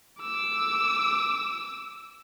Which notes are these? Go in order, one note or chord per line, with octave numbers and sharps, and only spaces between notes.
D6 E6